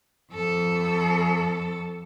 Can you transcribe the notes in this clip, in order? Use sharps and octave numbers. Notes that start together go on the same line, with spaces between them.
F2 A4